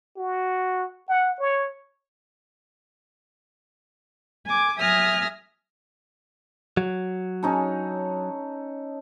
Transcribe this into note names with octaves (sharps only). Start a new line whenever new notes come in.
F#4
F#5
C#5
G#5 D6
F#3 E5 G#5 D#6 F6 A#6
F#3
C#4 D#4 A4